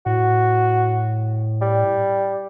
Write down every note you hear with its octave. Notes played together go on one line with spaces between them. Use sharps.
A2 F#4
G3